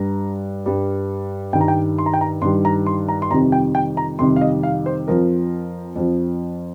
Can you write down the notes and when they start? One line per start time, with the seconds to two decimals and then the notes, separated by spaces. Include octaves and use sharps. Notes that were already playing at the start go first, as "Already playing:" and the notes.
Already playing: G2 G3 A#5
0.66 G2 G3
1.53 G2 D#3 G3 G5
1.61 A#5
1.68 G5
1.98 C6
2.06 A#5
2.14 G5
2.21 A#5
2.42 G2 D#3 G3 C6
2.65 A#5
2.86 C6
3.09 A#5
3.22 C6
3.31 F2 C3 D#3 G3 A#5
3.52 G5
3.75 G5
3.97 A#5
4.19 F2 C3 D#3 G3 C6
4.36 F5
4.41 D#5
4.63 F5
4.86 C5
5.08 F2 F3 A#4
5.96 F2 F3